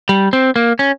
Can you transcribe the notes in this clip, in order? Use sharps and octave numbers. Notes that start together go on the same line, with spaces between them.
G3
C4
A#3
C#4